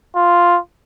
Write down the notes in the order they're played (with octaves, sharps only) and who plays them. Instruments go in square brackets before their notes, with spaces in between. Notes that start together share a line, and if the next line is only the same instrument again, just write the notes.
[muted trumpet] F4